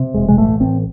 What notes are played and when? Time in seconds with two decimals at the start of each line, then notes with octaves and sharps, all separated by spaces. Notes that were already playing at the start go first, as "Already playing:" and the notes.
Already playing: C3
0.14 E1 G#3
0.29 G#3
0.38 A1 A3
0.60 A1 C4